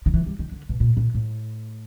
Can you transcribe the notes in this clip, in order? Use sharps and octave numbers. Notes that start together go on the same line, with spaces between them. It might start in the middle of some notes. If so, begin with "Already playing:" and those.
D#3
E3
G3
D#3
D3
B2
A#2
A#2
A2